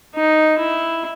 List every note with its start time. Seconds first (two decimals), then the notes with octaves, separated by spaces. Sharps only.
0.15 D#4
0.59 E4